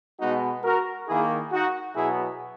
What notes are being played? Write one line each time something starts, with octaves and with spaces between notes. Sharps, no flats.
B2 G#3 B3 D#4 F#4
F#4 A#4
D#3 A#3 E4 G#4
D#4 F#4
B2 F#3 B3 E4 G#4